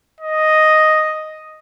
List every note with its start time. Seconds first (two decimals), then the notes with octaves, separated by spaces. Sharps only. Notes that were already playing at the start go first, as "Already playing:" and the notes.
0.21 D#5